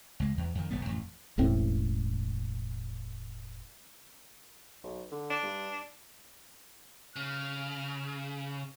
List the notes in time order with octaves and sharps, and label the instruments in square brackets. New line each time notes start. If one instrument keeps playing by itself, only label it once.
[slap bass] C#2 G#3
E2
F2 D#3
E1 B1 G3 B3
A1 F2 G#2
[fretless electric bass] E1 A1 A2 C4
[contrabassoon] B1
D3
[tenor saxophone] D4
[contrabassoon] G2
[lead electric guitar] C#3 [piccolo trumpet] F6